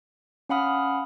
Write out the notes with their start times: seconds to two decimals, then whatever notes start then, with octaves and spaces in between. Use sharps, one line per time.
0.49 C#4 F5 F#5 B5 D#6 F6